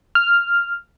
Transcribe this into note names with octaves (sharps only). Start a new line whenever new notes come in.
F6